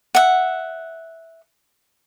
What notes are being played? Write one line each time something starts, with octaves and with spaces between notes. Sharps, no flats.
E5 F#5